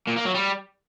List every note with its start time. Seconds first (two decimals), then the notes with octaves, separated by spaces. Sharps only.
0.08 A#2
0.17 A#3
0.26 F#3
0.35 G3